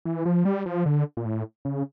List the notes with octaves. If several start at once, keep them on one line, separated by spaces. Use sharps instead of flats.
E3
F3
G3
F3
D3
A#2
A2
C#3